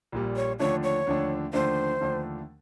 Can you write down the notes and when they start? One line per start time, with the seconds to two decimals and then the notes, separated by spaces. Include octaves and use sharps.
0.12 A#1 A#2 G3
0.36 C#5
0.59 D#2 D3 F3 A3 D4 C#5
0.83 C#5
1.06 D#2 D3 F3 A3 D4
1.53 D#2 D3 F3 A3 D4 C5
2.01 D#2 D3 F3 A3 D4